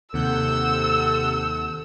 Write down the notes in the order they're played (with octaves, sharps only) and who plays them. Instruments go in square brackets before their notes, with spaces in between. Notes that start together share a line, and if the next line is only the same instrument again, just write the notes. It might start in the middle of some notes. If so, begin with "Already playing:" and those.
[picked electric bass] D#2 [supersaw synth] C3 F#5 G6 [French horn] A4 [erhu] E6